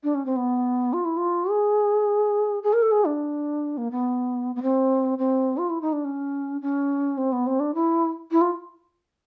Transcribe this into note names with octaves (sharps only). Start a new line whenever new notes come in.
D4
C#4
C4
B3
F4
E4
F4
G#4
G#4
A#4
A4
G#4
D4
A#3
B3
B3
C4
C4
F4
E4
D#4
D4
C#4
C#4
C4
B3
C4
D4
E4
E4
F4